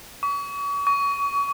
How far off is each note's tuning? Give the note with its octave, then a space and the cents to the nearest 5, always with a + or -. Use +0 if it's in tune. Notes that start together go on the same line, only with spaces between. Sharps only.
C#6 +40
C#6 +30